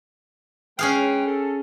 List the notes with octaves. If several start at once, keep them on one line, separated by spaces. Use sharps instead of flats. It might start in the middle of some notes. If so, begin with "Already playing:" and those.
G#3 C#4 G#4 B4 F5 G5
A4